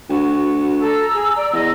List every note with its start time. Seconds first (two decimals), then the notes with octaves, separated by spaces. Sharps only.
0.09 D2 F#4
0.80 A4 A#5 E6
1.13 G#4
1.36 D5
1.53 E2 D#5